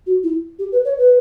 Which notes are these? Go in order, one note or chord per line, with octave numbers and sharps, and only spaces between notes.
F#4
E4
G4
B4
C#5
B4